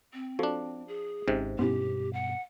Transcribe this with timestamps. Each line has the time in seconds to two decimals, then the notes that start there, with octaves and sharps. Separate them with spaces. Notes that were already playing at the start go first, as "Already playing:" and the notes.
0.14 C4
0.39 F3 D4 F#4 A4
0.88 G#4
1.28 G#1 G#2 C3 C#4
1.59 G2 B2 B3 C#4 E4 G4
2.13 F#5